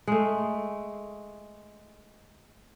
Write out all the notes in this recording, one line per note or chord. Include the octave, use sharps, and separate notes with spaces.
G#3 A3